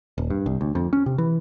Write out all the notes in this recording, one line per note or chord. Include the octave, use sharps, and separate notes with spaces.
D#1
G2
C2
D2
F2
C#4
C3
E3